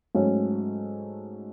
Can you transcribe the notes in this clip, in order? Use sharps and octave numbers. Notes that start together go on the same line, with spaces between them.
G#2 F#3 A3 C#4